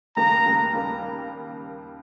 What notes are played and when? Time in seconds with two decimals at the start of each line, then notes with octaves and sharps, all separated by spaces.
0.16 D#2 C#3 G3 A#3 A#5
0.44 D#2 C#3 G3 A#3
0.73 D#2 C#3 G3 A#3